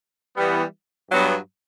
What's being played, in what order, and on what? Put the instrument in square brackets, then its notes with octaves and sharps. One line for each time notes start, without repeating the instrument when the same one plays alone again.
[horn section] E3 G3 B3
G2 F#3 B3